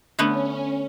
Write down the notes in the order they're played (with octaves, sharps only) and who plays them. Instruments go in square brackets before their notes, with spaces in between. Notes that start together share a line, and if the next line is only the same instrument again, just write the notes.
[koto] D3 A3 B3 [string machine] C#4